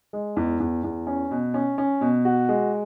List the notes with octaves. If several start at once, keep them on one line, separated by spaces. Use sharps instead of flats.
G#3
E2
E2
E2
C#4
B2
C#4
C#4
B2
F#4
G#3